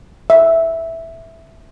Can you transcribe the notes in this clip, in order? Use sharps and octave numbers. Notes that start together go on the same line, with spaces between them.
E5